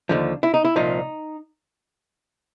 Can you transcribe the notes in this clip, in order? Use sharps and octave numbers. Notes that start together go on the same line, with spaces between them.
D#2 D3 F3
E4
D#4
E4
C2 A#2 F3 D#4